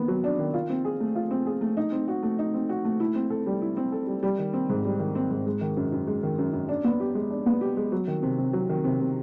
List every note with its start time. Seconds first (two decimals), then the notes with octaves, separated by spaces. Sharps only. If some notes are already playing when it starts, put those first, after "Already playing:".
Already playing: D#3 B3
0.08 F#3
0.24 D4
0.39 D#3
0.54 F4
0.70 C4
0.85 G#4
1.00 A3
1.15 F4
1.31 C4
1.46 G#4
1.61 A3
1.77 D#4
1.92 C4
2.08 F#4
2.23 A3
2.39 D#4
2.54 C4
2.69 F#4
2.85 A3
3.00 E4
3.15 C4
3.30 A4
3.46 G3
3.62 E4
3.77 C4
3.92 A4
4.07 G3
4.23 G3
4.39 D#3
4.53 C4
4.69 G#2
4.85 G3
4.99 D#3
5.15 C4
5.30 G#2
5.46 G#3
5.61 D#3
5.77 F#2
5.92 F#2
6.07 G#3
6.23 D#3
6.38 F#2
6.53 F#2
6.69 D4
6.84 B3
7.00 G4
7.15 G#3
7.30 D4
7.46 B3
7.61 G4
7.77 G#3
7.92 F#3
8.08 D#3
8.23 C3
8.38 C3
8.53 F#3
8.69 D#3
8.84 C3
9.00 C3